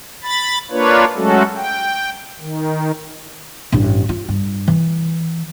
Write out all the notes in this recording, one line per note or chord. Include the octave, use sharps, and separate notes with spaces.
B5 A6
A#3 D4 F4 B4 C#5
F#3 G#3 A3 C#4 F#4 A4
G5
D#3
A1 G2
F4
G2
E3